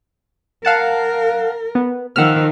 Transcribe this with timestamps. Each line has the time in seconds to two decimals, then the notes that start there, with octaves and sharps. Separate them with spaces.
0.65 A#4 F5 F#5 A5
1.75 B3
2.16 D#3 F3 F#5 E6 F6